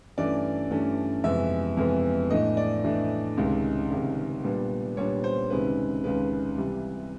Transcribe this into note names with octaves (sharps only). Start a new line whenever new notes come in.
G2 E3 A3 C#4 D5
G2 E3 A3 C#4
F2 C3 E3 G#3 B3 E5
F2 C3 E3 G#3 B3
A2 E3 A3 D4 D#5
D5
A2 E3 A3 D4
C#2 C3 D#3 G#3 C#4
C#2 C3 D#3 G#3 C#4
A#2 G3 B3 D4
A#2 G3 B3 D4 C#5
C5
C#2 C3 D#3 G#3 C#4 B4
C#2 C3 D#3 G#3 C#4 B4
C3 E3 G3